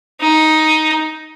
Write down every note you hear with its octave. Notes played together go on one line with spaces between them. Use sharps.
D#4